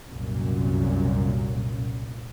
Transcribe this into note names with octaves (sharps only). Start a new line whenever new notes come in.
C2 F#2 A#2